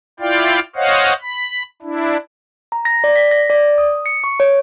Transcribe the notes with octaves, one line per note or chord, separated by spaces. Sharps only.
E4 F4 D5 F5 G5
C5 C#5 D#5 F5 F#5
B5
D4 E4
A#5
A#6
D5
B6
A#6
D5
D#6
C#7
C#6
C#5